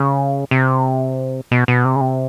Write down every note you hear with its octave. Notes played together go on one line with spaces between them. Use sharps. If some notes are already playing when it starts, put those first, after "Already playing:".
Already playing: C#3
C3
B2
B2
C3
C#3
C3